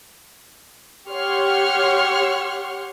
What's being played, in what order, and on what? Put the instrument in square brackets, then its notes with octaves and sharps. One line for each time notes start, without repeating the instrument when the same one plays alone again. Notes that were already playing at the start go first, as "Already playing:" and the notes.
[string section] G4 C#5 F#5 C6 C#6 F6